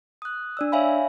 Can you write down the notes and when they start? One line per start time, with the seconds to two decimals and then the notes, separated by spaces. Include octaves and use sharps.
0.22 D#6 F#6
0.57 D4 D5 E6
0.72 C#5 E5 F5 G#5 B5